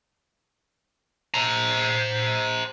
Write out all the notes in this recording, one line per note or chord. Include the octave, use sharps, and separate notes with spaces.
C5 A#5